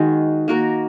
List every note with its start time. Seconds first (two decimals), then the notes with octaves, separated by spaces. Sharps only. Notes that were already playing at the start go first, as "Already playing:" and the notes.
Already playing: D#3 G#3 F#4
0.48 A#3 F#4 A#4